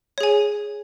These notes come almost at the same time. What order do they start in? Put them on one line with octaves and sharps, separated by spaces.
C#5 G#4 G#5